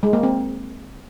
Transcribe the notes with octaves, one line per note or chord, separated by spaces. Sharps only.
G#3
A#3
C4